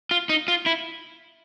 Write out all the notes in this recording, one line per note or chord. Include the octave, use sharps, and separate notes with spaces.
F4
D#4
F4
E4